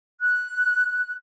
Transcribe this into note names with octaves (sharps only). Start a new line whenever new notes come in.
F#6